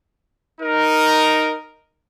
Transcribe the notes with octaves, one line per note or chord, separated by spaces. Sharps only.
D#4 A#4